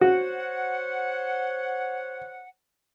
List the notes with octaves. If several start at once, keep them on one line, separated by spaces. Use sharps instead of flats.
F#4 C5 C#5 F#5